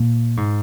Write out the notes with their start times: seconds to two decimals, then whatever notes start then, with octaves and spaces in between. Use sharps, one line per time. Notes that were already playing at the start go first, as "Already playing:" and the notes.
Already playing: A#2
0.37 G#2